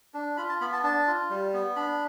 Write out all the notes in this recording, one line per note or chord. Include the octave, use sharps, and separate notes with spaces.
D4
F4 B5
A5
B3 B5
A5
D4 A5
F4
G3
B3
D4 B5